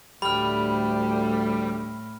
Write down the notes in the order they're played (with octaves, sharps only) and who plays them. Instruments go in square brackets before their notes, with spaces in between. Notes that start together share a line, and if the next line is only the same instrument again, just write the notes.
[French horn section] D2 [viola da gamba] A2 [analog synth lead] G3 [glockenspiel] B5 F6